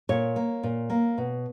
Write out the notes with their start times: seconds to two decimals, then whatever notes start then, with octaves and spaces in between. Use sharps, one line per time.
0.09 A#2 C#5
0.36 A#3
0.63 A#2
0.90 A#3
1.18 B2